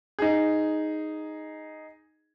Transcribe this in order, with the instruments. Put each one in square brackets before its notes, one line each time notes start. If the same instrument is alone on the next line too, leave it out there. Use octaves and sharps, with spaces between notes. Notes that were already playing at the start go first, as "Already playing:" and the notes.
[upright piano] D#4 G#4